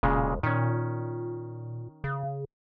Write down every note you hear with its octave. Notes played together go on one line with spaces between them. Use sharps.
E1 A#2 C#3 G#3
A#2 D#3 C#4
C#3